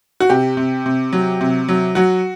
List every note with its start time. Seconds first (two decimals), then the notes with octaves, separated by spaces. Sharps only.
0.20 F#4
0.30 C3 G4
0.57 C3
0.86 C3
1.13 F#3
1.41 C3
1.68 F#3
1.95 F#3 F#4